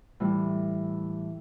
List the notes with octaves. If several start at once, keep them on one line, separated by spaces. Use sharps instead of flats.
A2 E3 G3